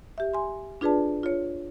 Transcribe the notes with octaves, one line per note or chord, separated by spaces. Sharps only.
G4 E5
G#5 C6
D4 F4 G#4 B4 D5 A5
F4 C#5